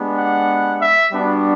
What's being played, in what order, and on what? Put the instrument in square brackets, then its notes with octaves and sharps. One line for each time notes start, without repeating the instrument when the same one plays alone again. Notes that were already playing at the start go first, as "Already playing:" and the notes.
Already playing: [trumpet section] G#3 B3 D4 G4
F#5
E5
G3 B3 D4 F#4